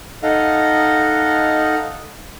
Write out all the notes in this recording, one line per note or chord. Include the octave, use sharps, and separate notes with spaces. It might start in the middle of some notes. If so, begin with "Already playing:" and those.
D#4 A4 D#5 F5 F#5